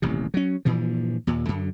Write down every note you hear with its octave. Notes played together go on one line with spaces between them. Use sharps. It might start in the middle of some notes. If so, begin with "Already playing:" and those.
D#1 A1 C3
F#3 C#4
G2 A#2 E3 F3
D#2 A#2
F#2 D3